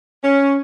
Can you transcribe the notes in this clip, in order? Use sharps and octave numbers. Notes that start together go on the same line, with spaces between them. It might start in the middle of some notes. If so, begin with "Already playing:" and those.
C#4